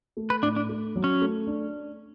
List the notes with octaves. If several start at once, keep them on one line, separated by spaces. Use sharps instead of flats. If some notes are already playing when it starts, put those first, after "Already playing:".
A3
B4
A2 D4
D4
A3
F#3
C#4
A3
D4